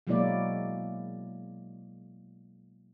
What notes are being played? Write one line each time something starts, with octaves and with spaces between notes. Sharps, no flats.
B2 F#3 G#3 A#3 E4 D5